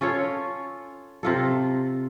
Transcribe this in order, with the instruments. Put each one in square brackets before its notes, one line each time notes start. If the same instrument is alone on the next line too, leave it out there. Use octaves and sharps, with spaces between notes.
[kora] C#4 F4 A4 C#5
C3 F4 A4